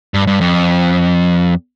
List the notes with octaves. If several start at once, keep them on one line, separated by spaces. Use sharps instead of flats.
G2
G2
F2